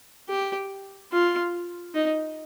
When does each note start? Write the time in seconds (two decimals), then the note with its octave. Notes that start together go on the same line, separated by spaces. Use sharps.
0.29 G4
1.12 F4
1.94 D#4